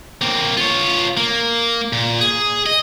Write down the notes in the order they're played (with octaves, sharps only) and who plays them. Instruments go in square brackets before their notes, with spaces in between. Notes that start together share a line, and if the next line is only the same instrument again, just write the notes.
[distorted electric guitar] A#3 C4
F4 C#5
A#3
A#2
G#4
D#5